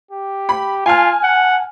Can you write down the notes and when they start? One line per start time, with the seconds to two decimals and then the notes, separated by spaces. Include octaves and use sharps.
0.11 G4
0.49 B5
0.86 F4 G#5 A5 F6
1.23 F#5